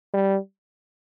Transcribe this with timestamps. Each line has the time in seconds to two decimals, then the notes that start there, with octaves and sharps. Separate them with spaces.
0.14 G3